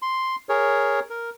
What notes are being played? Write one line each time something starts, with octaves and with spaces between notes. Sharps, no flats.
C6
G#4 A#4 C#5
A#4